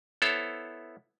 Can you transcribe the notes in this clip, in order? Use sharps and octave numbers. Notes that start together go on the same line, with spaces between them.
B3 E4 A4 C5 C#5